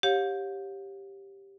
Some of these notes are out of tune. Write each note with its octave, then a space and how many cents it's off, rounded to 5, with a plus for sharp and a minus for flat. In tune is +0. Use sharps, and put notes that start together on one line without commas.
G4 +0 C#5 -20 F5 +40